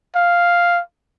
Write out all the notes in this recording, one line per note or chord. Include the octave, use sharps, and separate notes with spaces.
F5